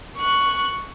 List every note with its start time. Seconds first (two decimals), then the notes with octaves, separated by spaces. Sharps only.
0.17 C#6 F#6